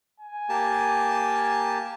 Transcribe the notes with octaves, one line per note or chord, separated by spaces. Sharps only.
G#5
A#3 G4 A5